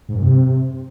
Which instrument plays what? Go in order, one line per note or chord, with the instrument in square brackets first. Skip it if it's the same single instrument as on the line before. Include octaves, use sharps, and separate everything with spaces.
[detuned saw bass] G#2
F#2
C3